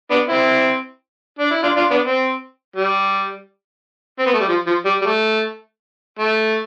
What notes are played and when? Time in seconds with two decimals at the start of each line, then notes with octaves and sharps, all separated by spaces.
0.10 B3 D4
0.29 C4 E4
1.39 D4
1.51 E4
1.63 D4 F4
1.76 D4 F4
1.91 B3 D4
2.06 C4
2.76 G3
4.19 C4
4.27 B3
4.34 A3
4.41 G3
4.48 F3
4.67 F3
4.85 G3
5.02 G3
5.06 A3
6.19 A3